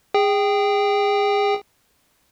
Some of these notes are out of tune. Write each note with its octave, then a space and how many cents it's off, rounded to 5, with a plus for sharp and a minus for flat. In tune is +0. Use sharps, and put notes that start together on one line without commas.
G#4 -20 G5 +0